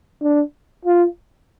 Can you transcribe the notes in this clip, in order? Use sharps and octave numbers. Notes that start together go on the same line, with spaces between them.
D4
F4